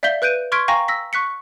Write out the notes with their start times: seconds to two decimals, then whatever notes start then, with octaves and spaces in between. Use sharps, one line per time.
0.03 D5 E5 F5 G6 B6 G7
0.22 B4 F#6 G6 D7 D#7
0.52 C6 C#6 F6 G#6 B6 D7
0.68 F5 G5 G#5 A#5 C#6 A#6
0.88 E6 A#6 B6
1.13 C#6 F#6 B6 C#7